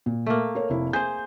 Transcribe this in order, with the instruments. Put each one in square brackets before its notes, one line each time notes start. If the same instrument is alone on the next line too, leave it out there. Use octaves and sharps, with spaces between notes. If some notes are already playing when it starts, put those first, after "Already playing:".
[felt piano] A#2
[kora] A3 A#3
[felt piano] A#4 C#5
F1 E4
[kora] G#4 C5 [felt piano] G6